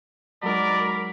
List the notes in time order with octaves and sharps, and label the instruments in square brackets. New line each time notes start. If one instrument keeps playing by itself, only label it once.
[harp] F#3 G#3 D#4 [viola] A#4 [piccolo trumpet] D5 [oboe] B5